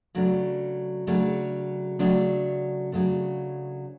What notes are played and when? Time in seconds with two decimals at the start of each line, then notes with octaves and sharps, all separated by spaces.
0.15 C#3 F#3 A3 D4
1.07 C#3 F#3 A3 D4
1.99 C#3 F#3 A3 D4
2.92 C#3 F#3 A3 D4